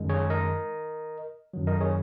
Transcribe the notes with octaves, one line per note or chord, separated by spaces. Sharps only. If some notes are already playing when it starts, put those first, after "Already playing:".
Already playing: F#2 D#3 G#3
G#4 C#5
A#4 D#5
F#2 D#3 F#3
A#4 D#5
G#4 C#5